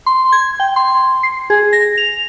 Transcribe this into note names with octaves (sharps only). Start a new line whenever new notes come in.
C6
G#6
G5
C6
C7
G#4
A#6
F7